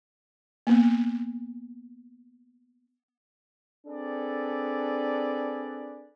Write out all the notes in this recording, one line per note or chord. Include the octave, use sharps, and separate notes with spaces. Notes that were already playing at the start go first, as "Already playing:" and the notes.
A#3 B3
C4 D4 G#4 A4 B4 D5